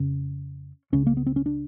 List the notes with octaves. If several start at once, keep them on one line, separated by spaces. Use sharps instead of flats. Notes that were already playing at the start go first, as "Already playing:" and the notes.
Already playing: F2 C#3 C#4
C#2 C#3 C#4
A#3
B3
C4
C#4
D4